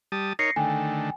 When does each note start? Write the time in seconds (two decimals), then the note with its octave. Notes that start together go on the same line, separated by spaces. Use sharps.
0.12 G3 A5 D#6
0.39 D#4 A#4 C#5 A#6 C7 C#7
0.56 D3 D#3 A3 G5 G#5